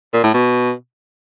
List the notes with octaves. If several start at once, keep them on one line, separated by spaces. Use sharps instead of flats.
A#2
A2
B2